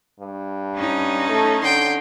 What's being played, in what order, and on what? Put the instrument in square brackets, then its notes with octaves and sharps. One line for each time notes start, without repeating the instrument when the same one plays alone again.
[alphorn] G2
[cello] C#4 D#4
[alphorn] A3
[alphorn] D3 [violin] G5 C6